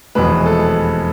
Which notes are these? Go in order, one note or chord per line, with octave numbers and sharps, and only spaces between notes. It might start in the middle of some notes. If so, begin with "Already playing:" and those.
F1 E2 B2 G#3 B4
A4